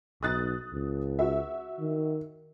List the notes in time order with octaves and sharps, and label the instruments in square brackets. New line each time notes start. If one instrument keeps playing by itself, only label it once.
[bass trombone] B1 [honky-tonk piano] D#6 F#6 A6
[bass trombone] C#2
[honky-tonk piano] F#4 E5
[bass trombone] D#3